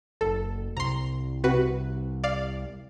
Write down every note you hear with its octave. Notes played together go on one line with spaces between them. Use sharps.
F#1 A4
C2 A#5 C6
C3 F#4 B4
D5 F5